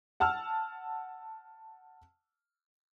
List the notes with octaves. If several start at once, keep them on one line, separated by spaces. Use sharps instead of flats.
F#5 A5 E6 F6